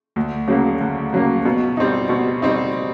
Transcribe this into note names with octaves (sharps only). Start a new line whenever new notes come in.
D2
C#3 F#3 A#3
D2
C#3 F#3 A#3
B2
G3 C4 D#4
B2
G3 C4 D#4